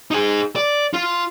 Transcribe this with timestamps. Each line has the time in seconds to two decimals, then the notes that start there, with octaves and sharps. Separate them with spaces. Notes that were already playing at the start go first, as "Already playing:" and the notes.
0.11 D#4 G#4
0.56 D5
0.94 F4